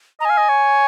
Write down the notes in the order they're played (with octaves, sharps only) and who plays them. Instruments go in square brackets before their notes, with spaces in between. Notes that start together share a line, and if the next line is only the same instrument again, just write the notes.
[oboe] D#5 [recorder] A#5
[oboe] F5 [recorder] G#5
[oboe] D#5
C#5